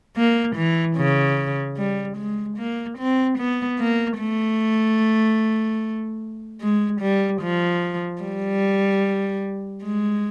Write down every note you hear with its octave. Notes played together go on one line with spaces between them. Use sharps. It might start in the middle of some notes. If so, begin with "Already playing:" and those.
A#3
E3
C#3
G3
G#3
A#3
C4
B3
A#3
A3
G#3
G3
F3
G3
G#3